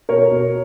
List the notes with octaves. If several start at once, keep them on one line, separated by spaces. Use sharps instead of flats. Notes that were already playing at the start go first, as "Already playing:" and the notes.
B2 A#4 C#5
B2